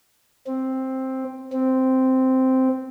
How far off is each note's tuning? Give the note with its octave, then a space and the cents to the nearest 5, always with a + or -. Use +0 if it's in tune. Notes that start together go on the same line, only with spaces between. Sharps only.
C4 +5
C4 -5